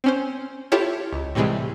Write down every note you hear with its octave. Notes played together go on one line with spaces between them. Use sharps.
C4 C#4 C5
E4 F4 G4 A4 C#5
C#2
A2 C3 E3 G3 G#3